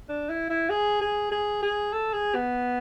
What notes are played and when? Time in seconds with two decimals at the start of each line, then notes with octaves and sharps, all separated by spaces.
0.09 D4
0.29 E4
0.50 E4
0.70 G#4
1.01 G#4
1.31 G#4
1.62 G#4
1.93 A4
2.13 G#4
2.34 B3